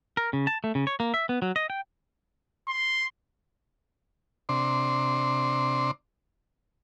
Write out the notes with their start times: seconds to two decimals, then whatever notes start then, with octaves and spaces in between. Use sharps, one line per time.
0.17 A#4
0.33 C#3
0.47 A5
0.64 A3
0.75 C#3
0.87 C#5
1.00 A#3
1.14 E5
1.29 B3
1.42 F#3
1.56 D#5
1.70 G5
2.68 C6
4.49 C3 D4 C6